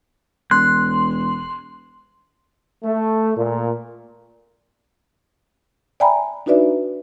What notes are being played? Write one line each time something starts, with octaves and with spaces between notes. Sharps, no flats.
E1 C6 F#6
A3
A#2
D5 E5 G5 G#5 A#5 B5
D4 D#4 F#4 B4 D5 E5